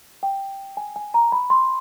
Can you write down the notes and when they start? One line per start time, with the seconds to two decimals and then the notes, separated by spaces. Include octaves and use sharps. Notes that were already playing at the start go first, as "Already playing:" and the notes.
0.23 G5
0.77 G#5
0.96 G#5
1.14 A#5
1.32 B5
1.50 C6